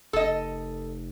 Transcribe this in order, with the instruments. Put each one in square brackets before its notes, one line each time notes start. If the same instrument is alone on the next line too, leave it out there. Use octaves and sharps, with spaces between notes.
[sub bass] F1 [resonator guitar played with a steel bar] A4 D#5